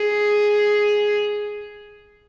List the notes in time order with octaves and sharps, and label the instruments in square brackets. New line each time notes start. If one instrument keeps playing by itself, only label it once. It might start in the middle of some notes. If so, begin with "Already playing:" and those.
Already playing: [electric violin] G#4